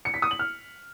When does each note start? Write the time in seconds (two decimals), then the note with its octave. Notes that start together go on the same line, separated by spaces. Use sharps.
0.05 C#7
0.14 B6
0.22 D#6
0.31 F#7
0.39 F6